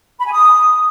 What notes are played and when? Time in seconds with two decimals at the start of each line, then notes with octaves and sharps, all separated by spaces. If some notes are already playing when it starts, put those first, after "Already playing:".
0.20 B5
0.26 G#5
0.33 D#6